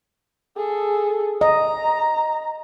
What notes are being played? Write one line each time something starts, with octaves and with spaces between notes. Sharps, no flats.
G#4 A4
D#5 A#5